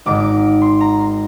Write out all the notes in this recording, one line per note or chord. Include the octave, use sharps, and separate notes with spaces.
G#1 G#2 D#3 D6
D6
C6
A#5
C6